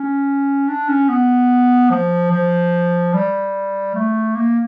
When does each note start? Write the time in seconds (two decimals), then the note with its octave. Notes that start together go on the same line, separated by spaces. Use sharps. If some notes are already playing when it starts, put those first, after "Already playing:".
Already playing: C#4
0.68 D4
0.88 C#4
1.09 B3
1.90 F3
2.31 F3
3.14 G3
3.95 A3
4.36 A#3